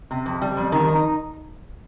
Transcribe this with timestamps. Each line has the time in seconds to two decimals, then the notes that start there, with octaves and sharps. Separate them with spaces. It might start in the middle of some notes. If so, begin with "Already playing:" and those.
0.11 C3
0.26 F2
0.42 G3
0.57 F2
0.72 D#3
0.88 D#4